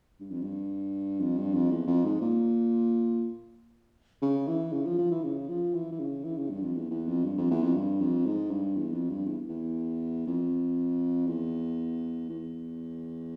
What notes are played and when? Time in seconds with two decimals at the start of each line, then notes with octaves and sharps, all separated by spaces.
0.20 G2
0.31 F2
0.42 G2
1.20 F2
1.38 G2
1.54 F2
1.71 E2
1.87 F2
2.05 G#2
2.21 A#2
4.22 C#3
4.48 E3
4.72 C#3
4.85 F3
4.98 F3
5.11 E3
5.24 C#3
5.49 F3
5.74 E3
5.92 E3
5.99 C#3
6.24 E3
6.37 C#3
6.50 G2
6.62 F2
6.75 E2
6.91 E2
7.08 F2
7.24 G2
7.38 F2
7.51 E2
7.63 F2
7.75 G2
8.01 F2
8.26 G#2
8.51 G2
8.76 E2
8.93 F2
9.10 G2
9.26 E2
9.49 E2
10.27 F2
11.27 E2
12.29 E2